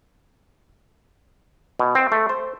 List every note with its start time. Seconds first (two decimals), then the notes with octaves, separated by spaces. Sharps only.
1.80 B2
1.95 C4
2.12 A3
2.29 C5